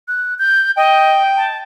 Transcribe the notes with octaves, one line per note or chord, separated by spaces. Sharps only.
F#6
G6
D#5 G5
A5